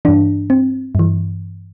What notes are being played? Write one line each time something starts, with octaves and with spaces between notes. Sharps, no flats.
G2 E3 D4
C4
G2 E3